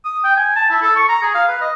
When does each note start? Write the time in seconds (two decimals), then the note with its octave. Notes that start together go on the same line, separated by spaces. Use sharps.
0.05 D#6
0.24 G5
0.36 G#5
0.56 A5
0.70 E4
0.82 A4
0.96 C#6
1.09 A#5
1.22 G#4
1.34 F5
1.48 B4
1.61 D#5